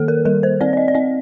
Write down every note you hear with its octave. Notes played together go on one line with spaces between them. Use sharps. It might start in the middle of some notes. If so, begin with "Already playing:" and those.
Already playing: D#3 A#3 A4
A#4
G3 A#4
C5
C4 D5
D5
D#5
D5
C4 D#5